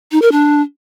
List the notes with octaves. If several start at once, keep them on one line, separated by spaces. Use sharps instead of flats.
D#4
A#4
D4